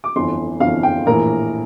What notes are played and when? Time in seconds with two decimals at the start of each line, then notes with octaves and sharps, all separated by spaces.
0.04 D6
0.16 G1 F2 E3 C6
0.60 G1 F2 E3 F5
0.83 G5
1.06 A#1 A2 E3 A#4